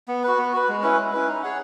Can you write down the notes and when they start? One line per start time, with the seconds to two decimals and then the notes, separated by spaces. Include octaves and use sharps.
0.08 B3
0.23 F#4 B4
0.38 B3
0.53 F#4 B4
0.69 G#3
0.82 C#4 E4 B4
0.98 G#3
1.13 C#4 E4 B4
1.27 D#4
1.43 G#4 C#5 F#5